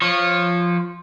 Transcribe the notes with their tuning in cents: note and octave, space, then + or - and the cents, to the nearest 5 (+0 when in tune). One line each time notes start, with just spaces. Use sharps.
F3 +0 C#5 -20